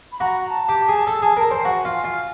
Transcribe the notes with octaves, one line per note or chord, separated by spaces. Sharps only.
B5
F#4 A#5
A5
G4
G#4
A4
G#4
A#4
C5
G5
F#4 G#5
F4
G#5
F4